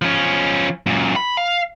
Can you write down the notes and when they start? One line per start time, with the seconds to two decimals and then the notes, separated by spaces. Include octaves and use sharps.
0.02 F3 C#4
0.86 F#2 A#2
1.16 B5
1.37 F5